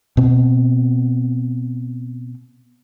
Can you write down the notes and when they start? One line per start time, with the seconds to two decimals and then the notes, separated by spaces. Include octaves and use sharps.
0.17 B2 C4